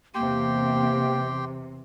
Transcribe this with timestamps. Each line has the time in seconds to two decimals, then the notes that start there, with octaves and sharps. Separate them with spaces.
0.15 E2 C3 A#3 G4 G5 C6